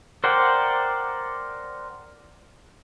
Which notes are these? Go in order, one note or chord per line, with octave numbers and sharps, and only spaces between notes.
A#4 C5 D5 F#5 G5